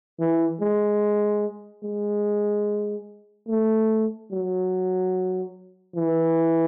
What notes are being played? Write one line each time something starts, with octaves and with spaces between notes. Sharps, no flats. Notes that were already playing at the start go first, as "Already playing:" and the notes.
E3
G#3
G#3
A3
F#3
E3